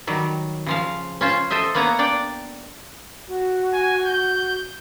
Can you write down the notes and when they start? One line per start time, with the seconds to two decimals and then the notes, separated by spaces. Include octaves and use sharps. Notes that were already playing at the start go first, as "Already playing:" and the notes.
0.07 D#3 F#3 G3
0.66 C#3 F3 F5
1.21 C#4 F4 C5
1.50 A4 C5 D#5 E5
1.75 A#3 B3 B4 C#5 F#5 A#5
1.99 D4 D5 G5
3.28 F#4
3.73 G#5
4.06 G6